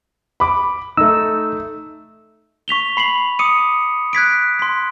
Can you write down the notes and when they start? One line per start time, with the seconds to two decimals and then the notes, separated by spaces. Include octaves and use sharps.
0.40 B5 D6
0.97 A3 D#4 E6
2.68 C#6 B6 F7 G7
2.97 B5 C7 F7 F#7
3.39 D6 D#6 C#7 D#7
4.13 F#6 G#6 B6 D7
4.59 C6 B6